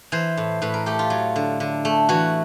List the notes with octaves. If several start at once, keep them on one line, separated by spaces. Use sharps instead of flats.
E3 C5
A2
A2 B4
A#4
A3 G4
F4
F#3
D3
D3
A3
E3 F#4